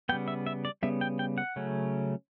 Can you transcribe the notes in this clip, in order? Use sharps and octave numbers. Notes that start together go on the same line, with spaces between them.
C#3 G3 B3 G5
E5
E5
D5
C#3 G3 B3 E5
G5
G5
F#5
C#3 F#3 A3 C#4